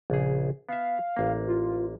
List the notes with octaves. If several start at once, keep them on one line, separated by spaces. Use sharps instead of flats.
A#1 C#3 G#4
B3 E5 F5
A1 A#3
F4